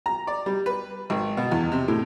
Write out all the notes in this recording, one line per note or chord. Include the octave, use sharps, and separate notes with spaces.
A#5
D5
G3
B4
G#1
B2
E2
C3
A2